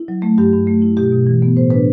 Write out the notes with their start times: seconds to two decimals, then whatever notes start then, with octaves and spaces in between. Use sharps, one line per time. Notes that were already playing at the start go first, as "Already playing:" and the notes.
Already playing: E4
0.08 F#3
0.22 A3
0.38 G2 G4
0.53 G2
0.67 A3
0.82 E4
0.97 B2 G4
1.12 B2
1.27 E3
1.42 B3
1.57 A2 C5
1.70 D4 B4